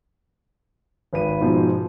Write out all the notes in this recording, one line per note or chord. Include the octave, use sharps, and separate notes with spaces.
G#1 B4 D#7
G#2 B2 F3